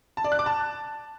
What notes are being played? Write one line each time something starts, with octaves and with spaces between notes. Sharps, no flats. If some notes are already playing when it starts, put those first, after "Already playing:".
A5
D5
F#6
D6
A5